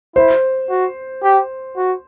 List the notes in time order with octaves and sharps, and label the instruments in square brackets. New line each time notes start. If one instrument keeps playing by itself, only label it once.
[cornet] E4 [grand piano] C5
[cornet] F#4
G4
F#4